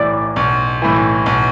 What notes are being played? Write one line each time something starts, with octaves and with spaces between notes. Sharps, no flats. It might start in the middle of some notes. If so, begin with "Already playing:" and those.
Already playing: B1 A2 E3 D5
B1
A2 E3
B1